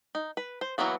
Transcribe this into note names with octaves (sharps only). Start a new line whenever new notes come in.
D#4
B4
C5
E3 F#3 A#3 B3 F#4